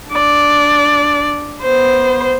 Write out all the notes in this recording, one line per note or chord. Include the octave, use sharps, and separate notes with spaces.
D4 D5
B3 C5